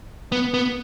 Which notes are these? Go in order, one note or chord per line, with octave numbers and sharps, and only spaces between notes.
B3
B3